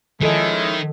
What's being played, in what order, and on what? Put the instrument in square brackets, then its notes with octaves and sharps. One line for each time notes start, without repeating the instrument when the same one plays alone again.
[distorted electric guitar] D#3 [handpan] F3 A4 D#5 [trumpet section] G#3 C#4 E4